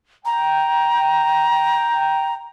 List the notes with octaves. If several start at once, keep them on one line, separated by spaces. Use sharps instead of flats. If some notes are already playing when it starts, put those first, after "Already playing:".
G5 A#5